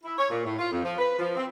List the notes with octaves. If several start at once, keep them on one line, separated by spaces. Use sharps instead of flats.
E4
C#5
A#2
A2
F4
F2
F3
B4
F3
C4